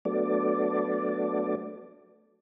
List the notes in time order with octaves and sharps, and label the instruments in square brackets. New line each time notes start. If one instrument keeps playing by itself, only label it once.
[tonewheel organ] F#3 A3 B3 D4 D5